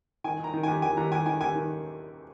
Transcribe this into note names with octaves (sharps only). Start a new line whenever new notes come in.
D#3 G#5
D#3 A#5
D#3
D#2 G#5
D#2 G#5
D#2 A#5
D#2 G#5
D#3 G#5
D#2 G#5
D#3